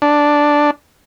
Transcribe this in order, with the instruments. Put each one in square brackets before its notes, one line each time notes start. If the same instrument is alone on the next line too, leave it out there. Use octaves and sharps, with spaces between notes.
[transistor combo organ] D4